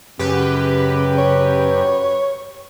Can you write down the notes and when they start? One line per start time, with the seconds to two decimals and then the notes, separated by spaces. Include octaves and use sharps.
0.19 F#2 C#3 G4 B4
1.18 C#5